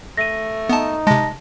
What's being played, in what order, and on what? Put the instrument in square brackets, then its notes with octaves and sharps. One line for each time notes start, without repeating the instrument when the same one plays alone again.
[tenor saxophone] A3 [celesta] A#6 D#7
[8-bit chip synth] B3 A5 [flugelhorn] D#4
[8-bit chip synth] C3 G#3 [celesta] A5 A#6